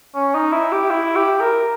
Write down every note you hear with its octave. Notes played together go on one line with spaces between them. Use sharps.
C#4
D#4
E4
G4
E4
G4
A#4